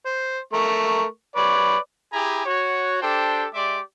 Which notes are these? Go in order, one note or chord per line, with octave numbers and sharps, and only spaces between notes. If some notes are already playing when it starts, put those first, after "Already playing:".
C5
A3 A#4 C#6
B4 C#5 D5
E4 G4 G#4 G#5 A#5 B5
F#4 C#5
D4 G4 A4 C5 G5 A5
G#3 G4 D5 E5 C6 D6